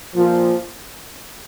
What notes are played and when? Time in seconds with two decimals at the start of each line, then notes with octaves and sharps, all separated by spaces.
0.16 A#2 F3